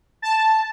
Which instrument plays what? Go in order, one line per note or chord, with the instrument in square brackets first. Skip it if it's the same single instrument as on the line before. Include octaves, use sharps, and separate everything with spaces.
[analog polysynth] A5